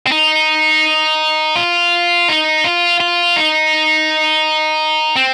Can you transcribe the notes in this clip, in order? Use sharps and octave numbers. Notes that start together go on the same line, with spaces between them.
C4
D#4
F4
D#4
F4
F4
D#4
C4